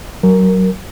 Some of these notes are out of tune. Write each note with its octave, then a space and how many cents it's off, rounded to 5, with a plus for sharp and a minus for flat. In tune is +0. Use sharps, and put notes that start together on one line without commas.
F#3 +20 A#4 +0